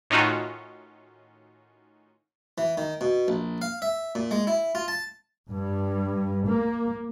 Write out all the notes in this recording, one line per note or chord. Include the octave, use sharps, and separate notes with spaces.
A2 D#3 C#4 D#4 F4 F#4
E3
D#3
B2
A#1
F5
E5
A#2
G#3
E4
F4
A5
G2
A#3